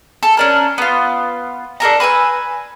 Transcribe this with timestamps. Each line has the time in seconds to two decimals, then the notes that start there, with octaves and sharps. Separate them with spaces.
0.23 A4
0.37 C#4 D4 A#4
0.78 B3 F4
1.80 D4 A4 A#4 A#5
2.00 B4 G#5 C6 E6